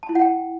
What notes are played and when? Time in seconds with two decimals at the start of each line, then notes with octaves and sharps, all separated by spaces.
0.03 A5
0.09 E4
0.15 F#5
0.22 G5